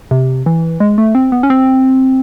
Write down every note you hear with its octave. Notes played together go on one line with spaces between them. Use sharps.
C3
E3
G#3
A3
C4
B3
C#4
C4